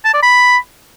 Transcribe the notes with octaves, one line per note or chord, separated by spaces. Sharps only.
A5
D5
B5